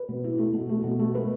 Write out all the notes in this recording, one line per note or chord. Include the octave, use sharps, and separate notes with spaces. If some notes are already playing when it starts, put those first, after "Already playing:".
Already playing: B4
B2
E4
A3
B2
A3
B2
A3
G#3 B4